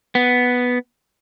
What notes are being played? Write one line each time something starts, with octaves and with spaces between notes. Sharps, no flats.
B3